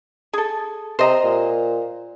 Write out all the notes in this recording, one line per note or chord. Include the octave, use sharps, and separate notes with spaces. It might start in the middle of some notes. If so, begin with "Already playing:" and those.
G#4 A4
C3 C5 D#5 A#5
A#2